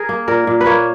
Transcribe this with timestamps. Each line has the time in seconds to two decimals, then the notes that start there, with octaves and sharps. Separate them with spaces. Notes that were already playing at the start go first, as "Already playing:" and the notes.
Already playing: G#4 A#4
0.09 A#3
0.28 A#2 A#4
0.47 A#2
0.61 B4
0.66 A#3 C#5